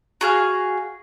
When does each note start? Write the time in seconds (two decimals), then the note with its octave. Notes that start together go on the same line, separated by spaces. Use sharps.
0.21 F#4 G#4 F5